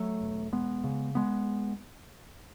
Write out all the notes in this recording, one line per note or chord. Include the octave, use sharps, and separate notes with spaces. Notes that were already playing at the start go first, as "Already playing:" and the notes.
Already playing: F#3 A3
E1
E1 G#3 B3
C#3
G#3 B3